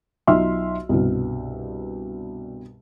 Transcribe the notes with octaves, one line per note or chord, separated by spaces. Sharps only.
B1 D#4 F4 E5 C6 F6
C2 G2 B2